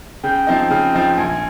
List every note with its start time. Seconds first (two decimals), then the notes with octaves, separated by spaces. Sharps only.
0.23 C#3 G5
0.47 F3 C4 D#4
0.71 C#3
0.94 F3 C4 D#4
1.18 A#1 G#5